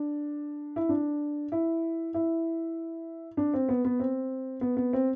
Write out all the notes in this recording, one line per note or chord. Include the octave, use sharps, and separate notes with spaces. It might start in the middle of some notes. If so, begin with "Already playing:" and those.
Already playing: D4
E4
D4
E4
E4
D4
C4
B3
B3
C4
B3
B3
C4